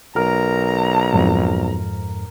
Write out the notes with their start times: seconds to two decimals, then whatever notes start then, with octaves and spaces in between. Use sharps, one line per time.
0.16 B1 A#4 A#5
1.13 F2 G#2